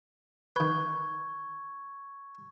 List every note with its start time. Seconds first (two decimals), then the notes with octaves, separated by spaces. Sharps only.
0.56 D#3 B4 C#6 G#6